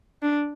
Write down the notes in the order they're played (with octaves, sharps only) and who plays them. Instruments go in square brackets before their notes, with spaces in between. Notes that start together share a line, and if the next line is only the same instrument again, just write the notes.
[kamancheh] D4